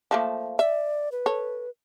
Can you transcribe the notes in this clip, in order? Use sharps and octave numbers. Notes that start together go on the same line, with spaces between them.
F3 A3 A#3
D5 E5
B4
A4 C#5